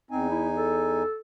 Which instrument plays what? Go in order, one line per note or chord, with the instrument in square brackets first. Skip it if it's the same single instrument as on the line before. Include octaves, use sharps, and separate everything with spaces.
[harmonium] E2 D#4 G#5 [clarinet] C4
[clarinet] E4
A4